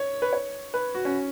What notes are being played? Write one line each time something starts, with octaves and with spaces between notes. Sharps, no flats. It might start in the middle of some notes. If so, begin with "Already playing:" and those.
Already playing: C#5
B4
C#5
B4
F#4
C#4